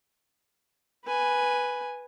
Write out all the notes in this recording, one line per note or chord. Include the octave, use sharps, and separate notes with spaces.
B4 G#5